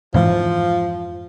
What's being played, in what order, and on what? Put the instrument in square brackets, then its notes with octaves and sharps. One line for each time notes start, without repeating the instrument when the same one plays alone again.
[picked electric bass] F2 G#2 E3 [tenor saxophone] F3